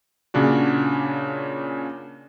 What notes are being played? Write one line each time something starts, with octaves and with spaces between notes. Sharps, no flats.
A#2 C#3 C#4 D4 F#4